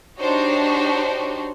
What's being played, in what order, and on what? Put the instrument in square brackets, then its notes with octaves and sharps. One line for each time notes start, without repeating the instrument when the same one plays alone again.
[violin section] D4 D#4 F#4 G4 C5 C#5